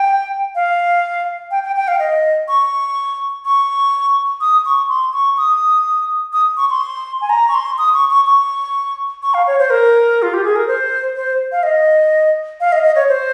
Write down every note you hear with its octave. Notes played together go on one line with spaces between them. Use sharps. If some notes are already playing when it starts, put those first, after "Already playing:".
Already playing: G5
F5
G5
G5
G5
F5
D#5
C#6
C#6
D#6
C#6
C6
C#6
D#6
D#6
C#6
C6
G#5
A#5
C#6
C6
D#6
C#6
C#6
C#6
C#6
F5
C#5
C5
A#4
F4
G4
G#4
A#4
C5
C5
F5
D#5
F5
D#5
D#5
C#5
C5